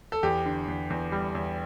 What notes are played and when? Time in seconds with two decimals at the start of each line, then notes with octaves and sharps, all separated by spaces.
0.12 A4
0.23 E2 G4
0.46 D3
0.68 E2
0.90 E2
1.12 G3
1.35 E2